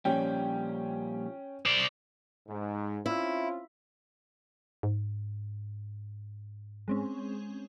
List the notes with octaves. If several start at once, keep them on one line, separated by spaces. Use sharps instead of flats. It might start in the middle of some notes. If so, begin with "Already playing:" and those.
A#2 F3 G3 C#4 G5
C5 D5
G#2
C4 C#4 E4 F4
G#2
G#3 C4 C#4